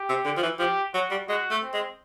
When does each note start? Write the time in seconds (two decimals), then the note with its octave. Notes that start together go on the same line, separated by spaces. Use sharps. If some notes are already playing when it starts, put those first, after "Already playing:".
Already playing: G4
0.09 C3
0.25 D3
0.37 F3
0.43 E3
0.59 F3 G4
0.94 F#3 F#4
1.11 G3
1.29 G#3 F#4
1.51 A3
1.62 C4
1.74 G#3